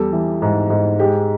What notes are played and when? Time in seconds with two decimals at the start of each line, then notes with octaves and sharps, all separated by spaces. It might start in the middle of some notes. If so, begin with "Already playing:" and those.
Already playing: E2 G3 A4
0.12 E3
0.42 G#2
0.70 G#2
0.99 G#3 G4